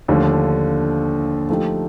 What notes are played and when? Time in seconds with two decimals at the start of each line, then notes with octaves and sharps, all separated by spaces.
0.08 D#2 D3 F3 A3
1.49 F3 A3 D#4 G4